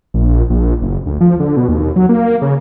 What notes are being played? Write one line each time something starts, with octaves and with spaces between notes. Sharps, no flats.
A#1
A#1
F#1
D2
F3
D3
B2
D#2
F#3
A#3
C#3